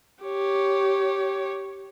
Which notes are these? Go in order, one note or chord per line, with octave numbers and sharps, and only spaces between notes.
G4 C#5